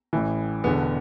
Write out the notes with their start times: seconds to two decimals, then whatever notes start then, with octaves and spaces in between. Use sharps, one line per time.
0.13 A1 A2 E3
0.64 E1 E2 D3 B3